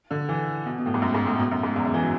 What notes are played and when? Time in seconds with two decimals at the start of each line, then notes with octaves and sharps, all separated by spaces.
0.11 D3
0.29 E3
0.66 B2
0.78 B2
0.86 A2
0.94 G#2
1.02 F#2
1.14 G#2
1.27 A2
1.39 B2
1.51 F#2
1.63 G#2
1.76 E2
1.85 F#2
1.94 E3
2.03 F#3